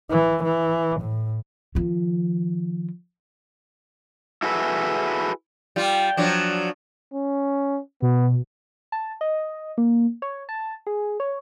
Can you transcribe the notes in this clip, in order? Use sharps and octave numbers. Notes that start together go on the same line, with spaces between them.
E3
E3
A2
D#3 F3
E4 F#4 G#4 A4 B4 E5
G3 F4
F3 F#3 D4
C#4
B2 B3
A5
D#5
A#3
C#5
A5
G#4
C#5